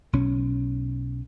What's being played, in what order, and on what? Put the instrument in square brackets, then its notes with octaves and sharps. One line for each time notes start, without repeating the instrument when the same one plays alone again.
[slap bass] B1 C#4